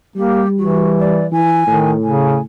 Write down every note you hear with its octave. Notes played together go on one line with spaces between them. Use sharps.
G3 A#3 G4
E3 F#4
D5
E3 G#5
A2 D#3
C#3 G#5